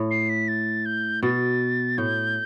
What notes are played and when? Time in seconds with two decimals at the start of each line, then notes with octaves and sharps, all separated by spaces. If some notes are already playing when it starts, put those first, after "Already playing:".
Already playing: A2
0.11 C7
0.29 B6
0.48 A6
0.86 G6
1.23 B2 A6
1.98 A2 G6